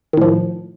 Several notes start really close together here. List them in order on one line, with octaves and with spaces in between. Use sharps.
D#3 A2 F3